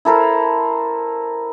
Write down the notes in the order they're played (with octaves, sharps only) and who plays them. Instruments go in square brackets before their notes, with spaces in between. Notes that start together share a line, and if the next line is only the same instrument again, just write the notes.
[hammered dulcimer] E4 A4 A#4 C5